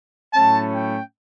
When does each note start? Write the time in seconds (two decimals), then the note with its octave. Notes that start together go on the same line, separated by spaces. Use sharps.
0.34 A2 F#3 A3 C#4 A5
0.74 G5